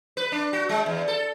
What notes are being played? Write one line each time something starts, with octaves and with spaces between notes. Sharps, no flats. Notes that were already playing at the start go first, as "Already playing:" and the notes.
B4
D4
F#4
G#3
E2
A4